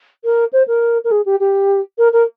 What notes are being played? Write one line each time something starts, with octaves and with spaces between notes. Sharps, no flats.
A#4
C5
A#4
A#4
G#4
G4
G4
A#4
A#4